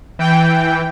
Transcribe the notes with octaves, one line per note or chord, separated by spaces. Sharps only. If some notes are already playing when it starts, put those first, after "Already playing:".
E3 G5